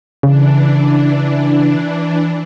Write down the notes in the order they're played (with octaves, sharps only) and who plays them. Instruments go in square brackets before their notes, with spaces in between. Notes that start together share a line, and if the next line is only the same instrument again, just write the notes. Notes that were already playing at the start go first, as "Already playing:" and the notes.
[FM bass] C#3 [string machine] E3 D4